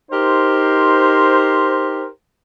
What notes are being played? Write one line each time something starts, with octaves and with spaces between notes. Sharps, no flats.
D#4 G4 A#4 C5